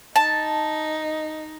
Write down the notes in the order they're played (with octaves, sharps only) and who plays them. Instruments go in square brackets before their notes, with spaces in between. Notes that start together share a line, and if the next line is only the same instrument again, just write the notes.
[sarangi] D#4 [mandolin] A5